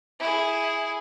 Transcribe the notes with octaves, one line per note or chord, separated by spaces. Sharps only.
E4 G#4